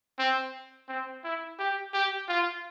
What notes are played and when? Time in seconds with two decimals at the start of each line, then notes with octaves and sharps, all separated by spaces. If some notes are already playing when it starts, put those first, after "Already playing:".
0.19 C4
0.88 C4
1.24 E4
1.59 G4
1.93 G4
2.28 F4